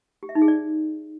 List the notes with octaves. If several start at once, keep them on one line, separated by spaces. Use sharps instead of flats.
G4
E5
D#4
G#4
D5